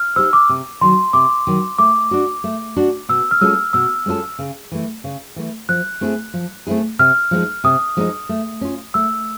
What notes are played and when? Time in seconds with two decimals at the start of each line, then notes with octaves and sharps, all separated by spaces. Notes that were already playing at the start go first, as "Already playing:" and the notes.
Already playing: F6
0.16 D#4 G4 C5 E6
0.33 D6
0.49 C3
0.81 D#3 F#3 C6
1.13 C3 D6
1.47 D#3 F#3
1.78 A3 D6
2.11 D4 F#4
2.44 A3
2.76 D4 F#4
3.09 B2 E6
3.31 F6
3.41 G#3 C#4 F4 A4 E6
3.73 B2 E6
4.06 G#3 C#4 F4 A4
4.39 C#3
4.72 E3 A3
5.04 C#3
5.36 E3 A3
5.69 F3 F#6
6.01 A3 C4 E4 G#4
6.34 F3
6.67 A3 C4 E4 G#4
6.99 C3 F6
7.31 F3 G#3 C4 D#4
7.64 C3 D#6
7.97 F3 G#3 C4 D#4
8.29 A3
8.61 C#4 F4
8.94 A3 E6